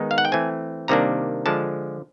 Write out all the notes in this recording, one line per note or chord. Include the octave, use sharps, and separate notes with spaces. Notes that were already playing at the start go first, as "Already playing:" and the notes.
Already playing: D#3 G#3 B3 D#4
F5
F#5
G5
E3 A3 C4 G#5
C3 D#3 G3 A#3 D4 A#5
D3 F3 G#3 A5